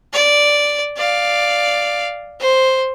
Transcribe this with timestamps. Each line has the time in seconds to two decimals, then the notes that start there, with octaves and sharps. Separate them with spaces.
0.13 D5
0.97 D5 F5
2.40 C5